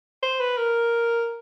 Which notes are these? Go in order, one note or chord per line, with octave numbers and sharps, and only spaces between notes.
C5
B4
A#4